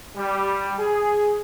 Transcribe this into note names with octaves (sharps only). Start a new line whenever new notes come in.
G3
G#4